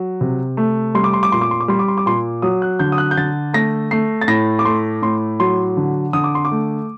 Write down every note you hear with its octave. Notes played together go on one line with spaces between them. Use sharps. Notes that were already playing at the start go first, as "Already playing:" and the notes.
Already playing: F#3
C3
A3
G3 C6
D6
C6
D6
A#2 C6
D6
C6
D6
G3 C6
D6
C6
D6
A#2 C6
F#3 D#6
F#6
D3 G6
D#6
F#6
G6
D3 A6
A3 A#6
A3 C7
A6
A2 A#6
D6
A3 C6
A2 C6
F#3 C6
D3
D3 D#6
D6
C6
D6
A3